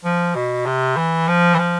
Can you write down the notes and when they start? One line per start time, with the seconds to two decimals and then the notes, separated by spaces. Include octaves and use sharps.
0.04 F3
0.35 B2
0.66 C3
0.97 E3
1.28 F3
1.54 E3
1.58 F3